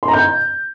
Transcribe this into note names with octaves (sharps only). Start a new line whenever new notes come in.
C6
A#5
G6